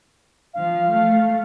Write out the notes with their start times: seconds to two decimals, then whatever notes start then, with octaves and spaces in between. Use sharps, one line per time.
0.54 F3 F5
0.90 A3